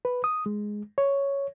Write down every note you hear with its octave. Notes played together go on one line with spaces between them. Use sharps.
B4
D#6
G#3
C#5